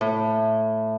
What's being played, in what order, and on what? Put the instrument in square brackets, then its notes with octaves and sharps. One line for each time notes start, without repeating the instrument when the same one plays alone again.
[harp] A2